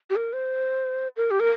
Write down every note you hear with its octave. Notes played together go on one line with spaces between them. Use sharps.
G4
A#4
C5
A#4
G4
A#4